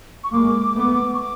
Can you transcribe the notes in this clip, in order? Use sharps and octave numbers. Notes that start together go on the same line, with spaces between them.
C#6
G#3 A#3 D6
A3 B3
C#6
D6